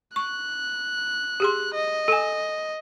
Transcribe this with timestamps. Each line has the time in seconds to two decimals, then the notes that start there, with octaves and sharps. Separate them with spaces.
0.16 C#6 F#6
1.40 G4 G#4 C6
1.74 D#5
2.08 A4 G#5